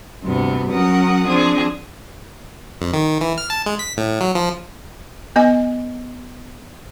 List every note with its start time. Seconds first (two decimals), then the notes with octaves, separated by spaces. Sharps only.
0.22 D2 G2 C3 B3
0.70 F#3 C#4 A#4 F#5 D#6
1.27 F3 C4 D4 G#4
2.81 F2
2.93 D#3
3.21 E3
3.38 F6
3.50 A5
3.66 G#3
3.79 B6
3.97 A2
4.21 F#3
4.35 F3
5.36 B3 D#5 G#5